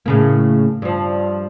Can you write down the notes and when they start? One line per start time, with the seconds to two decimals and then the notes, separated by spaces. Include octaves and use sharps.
0.06 A2 C#3 A#3
0.82 G2 F3